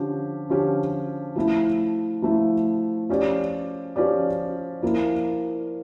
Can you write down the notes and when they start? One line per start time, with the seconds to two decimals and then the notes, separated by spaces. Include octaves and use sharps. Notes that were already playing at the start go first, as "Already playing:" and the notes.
Already playing: D3 F3 C#4 G4
0.49 D3 F3 C#4 G4
1.36 F3 A3 E4
2.22 F3 A3 E4
3.09 F3 C#4 G4 D5
3.96 F3 C#4 G4 D5
4.82 F3 A#3 E4